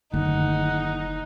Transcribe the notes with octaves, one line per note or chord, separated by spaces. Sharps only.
F#1 D3 D#3 A3 D#4 F#5